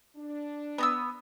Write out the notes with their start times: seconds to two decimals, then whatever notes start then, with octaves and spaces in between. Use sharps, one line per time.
0.16 D4
0.78 B3 A#5 E6